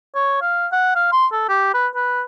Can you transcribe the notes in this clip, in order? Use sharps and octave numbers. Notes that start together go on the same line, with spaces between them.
C#5
F5
F#5
F5
C6
A4
G4
B4
B4